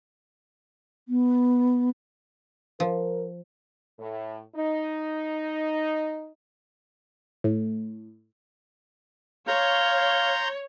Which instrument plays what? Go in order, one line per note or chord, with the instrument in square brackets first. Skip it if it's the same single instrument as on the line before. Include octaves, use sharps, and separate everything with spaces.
[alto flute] B3
[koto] F3 [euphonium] A#4
[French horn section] A2
D#4
[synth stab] A2
[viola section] C#5 [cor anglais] F5 [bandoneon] A#5 C6 G6